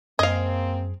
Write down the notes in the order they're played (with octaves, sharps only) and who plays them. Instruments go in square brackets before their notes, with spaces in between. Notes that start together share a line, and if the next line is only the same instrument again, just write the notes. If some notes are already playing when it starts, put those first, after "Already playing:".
[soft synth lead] F#2 [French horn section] A#3 C4 [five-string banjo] G#4 F5 [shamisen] D#5